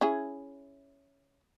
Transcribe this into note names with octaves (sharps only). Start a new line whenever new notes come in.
C#4 E4 G#4